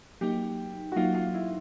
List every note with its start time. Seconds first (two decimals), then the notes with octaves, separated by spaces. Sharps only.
0.21 F#3 A#3 D#4 G4
0.92 F#4
0.96 F#3 A#3 D#4 F4
1.14 F4
1.34 E4